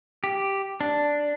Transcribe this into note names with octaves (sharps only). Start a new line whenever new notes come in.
G4
D4